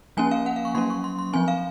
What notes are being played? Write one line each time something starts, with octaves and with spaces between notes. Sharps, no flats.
F3 A#3 C#4 G#5
F5
F#5
F5
C#6
F#3 A#3 C#4 C6
C#6
C6
C6
F3 C4 G#5
F5